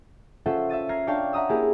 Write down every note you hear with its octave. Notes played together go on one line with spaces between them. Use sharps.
C#4 F4 A4 C5 E5 F#5
E5 E6 A6 D#7
A#5 F6 G#6 A#6 C7
D4 C#5 D5 F5 G5 A5
E5 F#5 A#5 D#6 E6
A#3 E4 G4 G#4 A#4